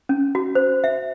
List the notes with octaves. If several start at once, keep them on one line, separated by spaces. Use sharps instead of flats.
C#4
F#4
C5
E5